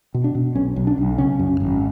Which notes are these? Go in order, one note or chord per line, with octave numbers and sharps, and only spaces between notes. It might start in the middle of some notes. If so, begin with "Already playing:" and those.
B2
D4
B2
B1 C#4
B1
D4
B1
C#3 C#4
F#2
G#1